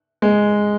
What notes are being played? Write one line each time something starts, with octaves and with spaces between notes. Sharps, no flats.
G#3